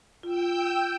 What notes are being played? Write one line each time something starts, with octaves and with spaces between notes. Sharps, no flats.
F4 G5 E6 G6